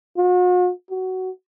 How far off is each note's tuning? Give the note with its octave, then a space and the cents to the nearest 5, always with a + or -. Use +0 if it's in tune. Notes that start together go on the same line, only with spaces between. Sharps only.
F#4 -45
F#4 +15